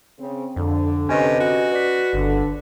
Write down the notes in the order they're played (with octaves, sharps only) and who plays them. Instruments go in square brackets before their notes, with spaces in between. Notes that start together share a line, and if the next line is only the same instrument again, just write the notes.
[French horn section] C#3 C4
[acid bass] F2 [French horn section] D3
[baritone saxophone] C3 [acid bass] C#4 [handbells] B4 D#5 G#5
[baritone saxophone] F#4
[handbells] B4 D5 B6
[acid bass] G1 [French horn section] D3